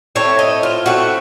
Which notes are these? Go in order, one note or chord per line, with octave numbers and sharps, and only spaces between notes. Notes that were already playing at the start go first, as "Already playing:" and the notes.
A2 A3 C4 C#5
D#5
F4
A2 A3 C4 F#4